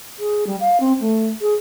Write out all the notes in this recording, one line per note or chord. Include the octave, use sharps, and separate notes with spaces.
G#4
G3
F5
C4
A3
G#4